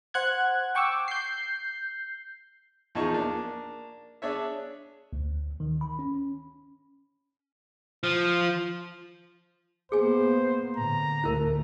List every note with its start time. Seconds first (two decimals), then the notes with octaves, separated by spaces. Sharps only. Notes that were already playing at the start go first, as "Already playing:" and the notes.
0.14 C5 F#5 F#6 G#6
0.75 G5 C#6 D6 E6
1.08 G6 C7
2.95 E2 F3 D#4 G#4 A5 C#6
3.13 A#3 D4
4.22 D4 G#4 C#5 E5
5.13 D2
5.60 D#3
5.81 B5
5.99 C#4
8.03 F3
9.92 A#3 B3 G#4 C5 G#5
10.77 A2 D3 A#5
11.24 D2 A3 E4 A#4